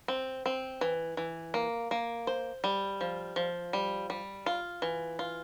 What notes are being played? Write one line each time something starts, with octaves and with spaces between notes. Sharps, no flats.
C4
C4
E3
E3
A#3
A#3
C5
G3
F3
F3
G3
G3
F4
E3
F4